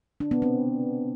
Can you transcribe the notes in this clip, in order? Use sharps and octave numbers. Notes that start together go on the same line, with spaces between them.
D4
B3
C4